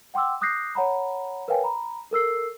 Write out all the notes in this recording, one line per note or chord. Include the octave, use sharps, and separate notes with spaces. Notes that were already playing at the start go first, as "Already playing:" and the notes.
F#5 G5 C6 D6 E6
D6 D#6 F#6 G6 A#6 C7
C#5 F#5 A#5 B5
A#4 B4 C#5 F5 G5 G#5
A#5 B5
A4 A#4 E6 C7